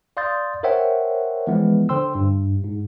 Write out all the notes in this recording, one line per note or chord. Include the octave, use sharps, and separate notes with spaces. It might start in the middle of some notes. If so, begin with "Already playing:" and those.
D5 F5 C6 D#6 G6 A6
A#4 C5 C#5 E5 F#5 G5
E3 F3 G#3 B3
D3 C5 G5 C6 E6
G2
G#2